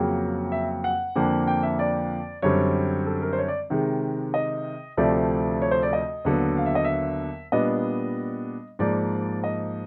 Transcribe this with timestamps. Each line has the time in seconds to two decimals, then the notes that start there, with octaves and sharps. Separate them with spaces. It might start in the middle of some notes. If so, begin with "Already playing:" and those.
Already playing: F2 C#3 F#3 A#3
0.52 E5
0.84 F#5
1.15 F2 D3 F3 A#3 D4
1.47 G5
1.63 E5
1.79 D5
2.42 F#2 D3 G3 C4 C#5
3.06 A4
3.22 A#4
3.33 C5
3.38 C#5
3.48 D5
3.70 C3 D#3 G#3
4.34 D#5
4.97 D2 C3 F3 A3 D5
5.62 C#5
5.71 C5
5.83 D5
5.93 D#5
6.25 D#2 D3 F#3 B3
6.57 F5
6.66 E5
6.75 D#5
6.85 E5
7.52 A#2 G3 B3 D4 D#5
8.79 G#2 F3 A#3 D5
9.44 D#5